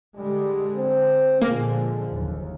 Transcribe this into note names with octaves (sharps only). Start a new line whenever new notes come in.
D3 G3 G#3
C4
A#2 D3 F3 G#3 A#3
F#1 D#2